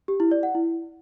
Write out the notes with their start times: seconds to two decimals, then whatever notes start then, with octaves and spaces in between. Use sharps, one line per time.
0.08 G4
0.20 E4
0.31 D5
0.43 F#5
0.55 E4